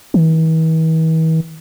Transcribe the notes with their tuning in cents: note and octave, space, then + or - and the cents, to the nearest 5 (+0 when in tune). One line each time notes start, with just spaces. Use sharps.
E3 -45